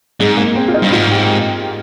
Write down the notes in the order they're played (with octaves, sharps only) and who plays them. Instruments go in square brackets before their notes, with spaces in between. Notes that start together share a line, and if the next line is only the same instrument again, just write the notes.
[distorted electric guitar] G#2 [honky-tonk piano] G#3
[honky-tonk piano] A#3
C4
F4
D#4
[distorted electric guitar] G2
[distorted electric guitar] G#2 [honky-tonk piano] F4
[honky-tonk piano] G4